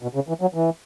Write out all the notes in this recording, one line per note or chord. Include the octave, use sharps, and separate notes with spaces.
B2
C#3
E3
F#3
E3